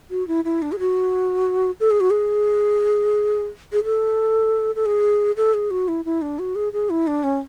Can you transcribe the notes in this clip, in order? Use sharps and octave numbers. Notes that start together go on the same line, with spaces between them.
F#4
E4
E4
D4
G#4
F#4
A4
G#4
F#4
G#4
G#4
A4
A4
G#4
A4
G#4
F#4
E4
E4
D4
F#4
G#4
G#4
E4
D4
C#4